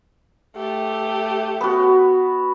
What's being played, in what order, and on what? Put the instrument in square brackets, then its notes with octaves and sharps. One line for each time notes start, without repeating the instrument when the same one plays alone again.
[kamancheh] A3 G4
[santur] B3 F#4